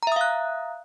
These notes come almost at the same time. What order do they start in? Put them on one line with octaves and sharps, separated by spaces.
A#5 E5 D#6 F5 F#6